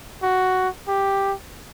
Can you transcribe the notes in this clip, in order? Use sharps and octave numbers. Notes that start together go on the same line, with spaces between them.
F#4
G4